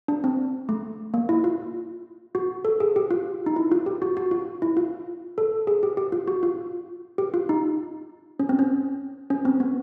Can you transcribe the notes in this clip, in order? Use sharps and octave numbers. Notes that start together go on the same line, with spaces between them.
D4
C4
A3
A#3
E4
F4
F#4
A4
G#4
G4
F4
D#4
E4
F4
G4
F#4
F#4
F4
E4
F4
A4
G#4
G4
G4
F4
F#4
F4
G4
F4
D#4
C#4
C4
C#4
C#4
C4
B3